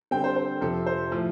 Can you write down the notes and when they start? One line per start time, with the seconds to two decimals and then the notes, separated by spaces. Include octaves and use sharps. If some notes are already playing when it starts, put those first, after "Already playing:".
0.11 D3 G3 C4 G5
0.24 C5
0.37 C5
0.61 F2 C3 F3 C4 A4
0.86 C5
1.12 A2 F3 A3